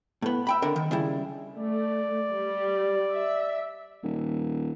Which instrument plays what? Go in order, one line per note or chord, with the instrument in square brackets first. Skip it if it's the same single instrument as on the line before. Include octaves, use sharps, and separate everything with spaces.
[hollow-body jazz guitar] A2 B3
E5 G5 B5
D3 A#4
D#3
C#3 G3 E4
[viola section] A3 [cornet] D5
[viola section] G3
E5
[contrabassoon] D#1